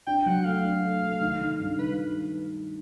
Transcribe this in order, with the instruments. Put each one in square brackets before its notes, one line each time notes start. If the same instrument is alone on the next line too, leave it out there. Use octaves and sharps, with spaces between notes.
[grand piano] D4 [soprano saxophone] G5
[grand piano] F#3 [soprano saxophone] F#5
[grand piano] A3 [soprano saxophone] F5
[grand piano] D4
A3
A3
D#3
D#3
G2
[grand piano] D#3 [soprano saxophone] B4